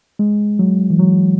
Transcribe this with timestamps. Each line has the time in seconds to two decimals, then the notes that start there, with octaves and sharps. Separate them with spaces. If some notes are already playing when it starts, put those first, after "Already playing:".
0.19 G#3
0.59 F#3
0.90 E3
0.99 F#3